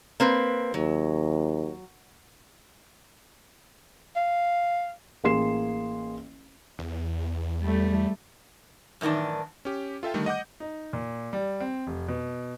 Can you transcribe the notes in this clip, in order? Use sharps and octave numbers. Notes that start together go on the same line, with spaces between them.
A#3 C4 B4
D#2 F#3
F5
A1 A#3 G#4 C6 C7 E7
E2
G3 A3
F#2 A2 D#3 E3 D4
C#4 G4
F4 A4 E5 G5
D3 D#3 G3 A3
D#5 F#5 D6 G6
D#4
A#2
G3
C4
F1
B2